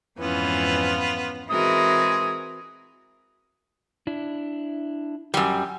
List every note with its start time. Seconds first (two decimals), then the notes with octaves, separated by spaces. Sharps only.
0.19 F2 G#2 E3 B3 C#4 F4
1.50 E3 G#3 C4 F#4 G#4 A#4 D#6
4.07 D4 E4
5.34 F#2 G3 G5